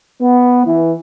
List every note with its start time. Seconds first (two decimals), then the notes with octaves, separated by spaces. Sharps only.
0.21 B3
0.65 E3